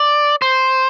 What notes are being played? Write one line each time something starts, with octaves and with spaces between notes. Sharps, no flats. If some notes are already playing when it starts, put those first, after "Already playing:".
Already playing: D5
C5